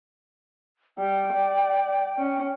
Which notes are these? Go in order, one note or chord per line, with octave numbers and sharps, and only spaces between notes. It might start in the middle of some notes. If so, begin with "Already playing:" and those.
G3 G5
D5
C#4